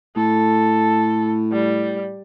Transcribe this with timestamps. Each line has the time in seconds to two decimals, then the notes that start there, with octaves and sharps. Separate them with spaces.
0.16 A2 A4
1.52 G3